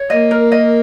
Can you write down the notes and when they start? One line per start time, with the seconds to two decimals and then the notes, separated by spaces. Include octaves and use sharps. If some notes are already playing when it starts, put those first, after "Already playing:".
Already playing: C#5
0.10 A#3 D#5
0.31 A#4
0.52 D#5